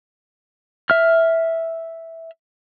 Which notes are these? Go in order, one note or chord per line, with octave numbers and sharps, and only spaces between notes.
E5 F6